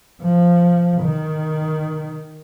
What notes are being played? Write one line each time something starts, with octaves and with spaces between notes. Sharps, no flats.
F3
D#3